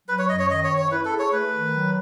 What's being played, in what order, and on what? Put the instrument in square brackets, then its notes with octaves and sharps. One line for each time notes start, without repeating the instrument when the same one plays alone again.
[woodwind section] F#3 [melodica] B4
[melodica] C#5
[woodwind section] F#2 [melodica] D#5
[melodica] C#5
[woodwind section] D#3 [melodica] D#5
[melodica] C#5
[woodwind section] F#2
[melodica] C#5
[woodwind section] E4 [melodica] B4
[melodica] A4
[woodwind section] G#4
[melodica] C#5
[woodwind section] A3 [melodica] B4
[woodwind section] D#3
F#3